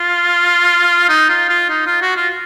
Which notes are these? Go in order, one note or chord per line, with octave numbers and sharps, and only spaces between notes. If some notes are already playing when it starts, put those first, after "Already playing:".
Already playing: F4
D#4
F4
F4
D#4
F4
F#4
F4